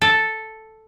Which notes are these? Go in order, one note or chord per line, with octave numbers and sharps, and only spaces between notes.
A4